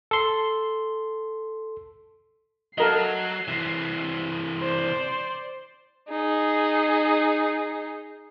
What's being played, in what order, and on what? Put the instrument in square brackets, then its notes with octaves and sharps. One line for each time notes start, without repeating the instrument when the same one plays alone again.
[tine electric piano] A4 C6
[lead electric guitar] F#3 [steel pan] A4 A#4 D#5 [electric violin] C7
[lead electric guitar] C3 E3
[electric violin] C5 D5
[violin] D#4 G#4